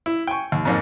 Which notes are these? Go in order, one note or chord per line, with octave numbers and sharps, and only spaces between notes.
E4
G5 G#5 C#6
D#2
F2 G#2 A#3